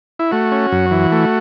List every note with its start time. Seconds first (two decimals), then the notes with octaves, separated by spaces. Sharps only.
0.19 E4
0.32 A3 F#4
0.52 C#4
0.72 F#2
0.91 E3
1.12 A3